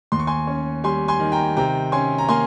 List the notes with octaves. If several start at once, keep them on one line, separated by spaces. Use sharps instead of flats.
D#2 C6
C#6
G#5 C6
C#4
G3 G#5 C6
G#5 C6
D#3
G5 A#5
C3 G5 A#5
C#4 G#5 C6
A#5
A#3 G#5 C6